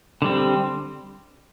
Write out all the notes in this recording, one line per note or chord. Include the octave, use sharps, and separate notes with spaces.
D3 G3 C4